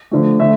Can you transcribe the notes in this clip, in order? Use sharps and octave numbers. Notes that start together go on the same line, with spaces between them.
D3 F3 A3
D3 A3 E5